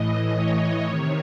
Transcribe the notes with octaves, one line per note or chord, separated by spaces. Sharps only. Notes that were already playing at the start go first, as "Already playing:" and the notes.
Already playing: A2 E3 D#5
C#5
C3 D#3